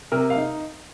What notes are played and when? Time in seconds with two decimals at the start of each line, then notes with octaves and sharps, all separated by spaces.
0.12 C3 A#4
0.30 F5
0.36 D#4